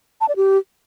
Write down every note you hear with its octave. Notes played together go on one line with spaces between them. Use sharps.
A5
D5
G4